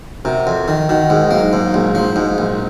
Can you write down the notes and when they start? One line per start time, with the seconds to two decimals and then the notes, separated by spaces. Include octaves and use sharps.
0.25 C3 F#4 A#4
0.47 F2
0.68 D#3
0.89 D#3 D#4 F#4
1.10 G#2 G#3
1.31 F#3 A#3
1.53 G#2 F#3
1.74 A#1 G#3
1.95 F3 F#3
2.16 G#2 G#3
2.38 A#1